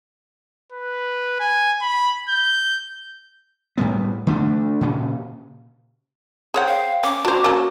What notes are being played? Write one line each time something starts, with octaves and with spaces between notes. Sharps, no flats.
B4
G#5
B5
G6
A2 G3 B3
D3 A3 D4
A#2 C#3
G#4 C5 C#5 F#5 G5
F5
C#4 D6
D4 F#4 C5 A5 A#5
A#3 C#4 A4